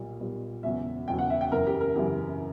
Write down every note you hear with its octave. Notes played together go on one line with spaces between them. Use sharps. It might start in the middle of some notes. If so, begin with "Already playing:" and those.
Already playing: B1 A#2 G3
B1 A#2 G3
E1 E2 C#3 F#3 E5
E1 E2 C#3 F#3 G5
F#5
E5
G5
F#1 F#2 C#3 E3 A#4
G4
A#4
F#1 F#2 C#3 E3 G4